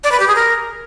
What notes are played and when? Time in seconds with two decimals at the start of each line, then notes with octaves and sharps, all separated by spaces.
0.04 D5
0.12 B4
0.20 G4
0.28 G#4
0.36 A#4